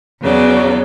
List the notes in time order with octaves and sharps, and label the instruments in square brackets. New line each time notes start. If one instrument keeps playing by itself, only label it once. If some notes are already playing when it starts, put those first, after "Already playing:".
[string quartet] E2 C#3 F#3 D5